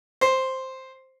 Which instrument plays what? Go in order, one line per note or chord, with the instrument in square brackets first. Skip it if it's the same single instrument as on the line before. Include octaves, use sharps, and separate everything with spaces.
[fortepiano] C5